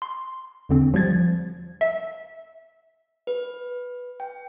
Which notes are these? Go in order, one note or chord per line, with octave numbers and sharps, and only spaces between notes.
C6
E2 D3 C4
F3 G3 G#6 A6
E5
B4
G5